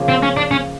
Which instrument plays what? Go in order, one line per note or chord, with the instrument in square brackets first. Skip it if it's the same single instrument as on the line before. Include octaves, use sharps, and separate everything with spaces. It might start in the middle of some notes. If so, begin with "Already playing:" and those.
Already playing: [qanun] C#3 F3 A#3
[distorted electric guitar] C4
C#4
D4
C#4